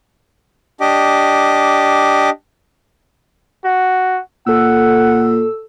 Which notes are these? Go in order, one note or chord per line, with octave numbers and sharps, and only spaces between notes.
D4 G4 D#5 D6
F#4
A#2 A4 F#5 E6